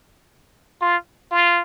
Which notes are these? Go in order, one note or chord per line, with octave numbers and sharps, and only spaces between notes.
F4
F4